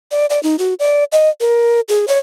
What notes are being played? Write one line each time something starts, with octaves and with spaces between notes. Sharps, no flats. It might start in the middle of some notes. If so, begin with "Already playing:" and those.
D5
D5
D#4
F#4
D5
D#5
A#4
G#4
C#5